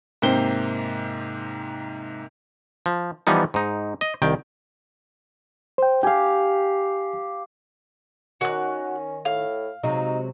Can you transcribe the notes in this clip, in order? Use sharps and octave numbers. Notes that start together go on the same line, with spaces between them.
G#2 C3 A#3 C5 G5 G7
F3
E3 F3 G3 B3 D#4
G#2 D#4
D#5
C2 D#3 G5
C5 G5
G4 F5 G5 G#5
D#3 C#4 F#4 F#6
A2 F5
C3 F#3 G#3 D#4